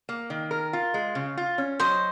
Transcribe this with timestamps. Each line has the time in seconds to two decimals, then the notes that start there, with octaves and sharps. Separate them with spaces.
0.09 A#3
0.30 D#3
0.51 A#4
0.73 F4
0.94 G#3
1.15 C#3
1.37 F4
1.58 C#4
1.80 F#3 C5 D#5